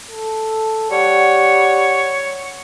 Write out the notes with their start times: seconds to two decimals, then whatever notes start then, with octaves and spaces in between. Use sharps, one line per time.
0.11 A4
0.91 G3 C#5 F#5